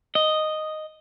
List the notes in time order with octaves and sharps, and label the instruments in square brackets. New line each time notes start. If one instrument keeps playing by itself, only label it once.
[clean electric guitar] D#5